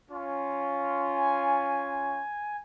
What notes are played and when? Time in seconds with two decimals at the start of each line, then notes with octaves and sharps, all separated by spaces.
0.11 C#4 F4
1.13 G#5